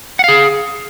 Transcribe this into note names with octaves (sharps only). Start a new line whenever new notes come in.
G#4 F5 F#5